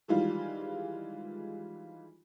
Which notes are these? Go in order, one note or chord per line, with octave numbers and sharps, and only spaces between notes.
D#3 E3 G3 G#3 F4